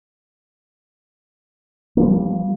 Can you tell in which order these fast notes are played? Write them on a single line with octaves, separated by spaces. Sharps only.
A#3 F3 G3